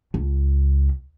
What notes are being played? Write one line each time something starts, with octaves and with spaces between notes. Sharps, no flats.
C#2